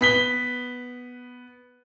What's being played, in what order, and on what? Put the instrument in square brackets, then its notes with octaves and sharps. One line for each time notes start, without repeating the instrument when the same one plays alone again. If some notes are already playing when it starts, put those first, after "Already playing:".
[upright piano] B3 B6 G7